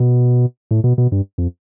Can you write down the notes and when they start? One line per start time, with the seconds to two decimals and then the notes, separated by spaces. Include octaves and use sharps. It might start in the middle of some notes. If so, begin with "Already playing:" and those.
Already playing: B2
0.71 A2
0.84 B2
0.98 B2
1.12 G2
1.38 F2